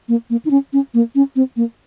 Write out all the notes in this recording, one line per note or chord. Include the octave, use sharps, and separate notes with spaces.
A#3
A#3
D#4
C#4
C#4
A#3
C#4
C4
A#3